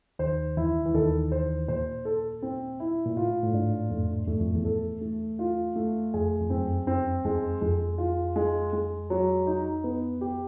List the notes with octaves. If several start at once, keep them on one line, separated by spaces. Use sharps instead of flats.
D#2 D#3 C5
E2 E3 E4
E3
D#2 D#3 A4
C5
A#2 C5
A4
C4
E4
A#2
A2 F4
A2
G#2 D4
F2 A3
E2 A3
F2
E2
A4
A3
F4
A3
F2 G#4
F2
F#2 C4
C4
E2 G#3
F2 G#3
F4
G#3
G#3
F#3
D#4
B3
G4